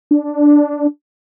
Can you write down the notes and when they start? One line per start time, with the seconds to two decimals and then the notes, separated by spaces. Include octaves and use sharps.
0.11 D4